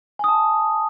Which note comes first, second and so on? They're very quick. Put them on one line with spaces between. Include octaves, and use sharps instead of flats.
G#5 D#6 A5